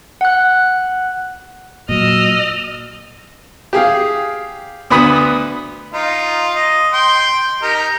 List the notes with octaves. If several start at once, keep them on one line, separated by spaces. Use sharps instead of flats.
F#5 F#6
A#2 F#3 D#5 E6 F6
G4 G#4 F5
D2 B3 B5 D#6
D#4 F4
D#5
G5 C6
D#4 G4 A#4